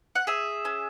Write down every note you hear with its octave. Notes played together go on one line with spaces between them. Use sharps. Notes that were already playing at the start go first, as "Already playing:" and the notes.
F#5
G#4 E5
C#4